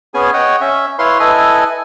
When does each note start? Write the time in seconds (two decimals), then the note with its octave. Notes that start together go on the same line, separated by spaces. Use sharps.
0.14 B3 C#4 G#4 G#5
0.34 C#5 D#5 F#5 G5
0.61 C#4 E5
0.99 E4 B4 C#5 F5 C6
1.20 E4 A4 B4 D#5 G#5